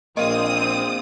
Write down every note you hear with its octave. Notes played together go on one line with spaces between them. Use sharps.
A#1 A#3 C4 D#5 F5 D#6